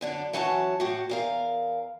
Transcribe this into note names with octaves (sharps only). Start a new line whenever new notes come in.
F#2 D3 D4
E3 F#3 C#4 F#4 F#5 A5
A2 F#4 G4
E2 A#4 F5